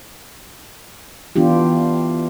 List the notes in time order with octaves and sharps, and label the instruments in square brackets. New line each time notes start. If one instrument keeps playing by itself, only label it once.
[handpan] E3 B3 D4 F4 G4